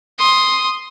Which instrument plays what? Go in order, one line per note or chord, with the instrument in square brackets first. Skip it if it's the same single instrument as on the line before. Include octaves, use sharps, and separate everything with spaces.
[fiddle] C6 D#6